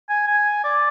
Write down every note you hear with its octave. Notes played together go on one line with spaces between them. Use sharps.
G#5
G#5
D5